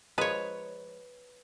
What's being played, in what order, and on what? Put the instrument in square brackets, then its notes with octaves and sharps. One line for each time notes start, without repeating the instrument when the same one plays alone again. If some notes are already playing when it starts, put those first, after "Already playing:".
[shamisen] F3 G#3 A#5 [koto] B4 C#5